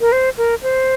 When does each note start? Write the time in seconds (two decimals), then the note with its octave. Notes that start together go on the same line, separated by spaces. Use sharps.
0.01 A#4
0.12 C5
0.37 A#4
0.63 C5